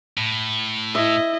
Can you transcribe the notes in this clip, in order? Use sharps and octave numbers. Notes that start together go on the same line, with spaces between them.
A2
E4 D#5 E5